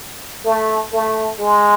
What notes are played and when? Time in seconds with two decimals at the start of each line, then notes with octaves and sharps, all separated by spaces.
0.45 A3
0.92 A3
1.40 G#3